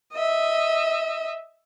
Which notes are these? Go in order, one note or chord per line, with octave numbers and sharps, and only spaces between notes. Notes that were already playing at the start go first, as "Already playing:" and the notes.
D#5 E5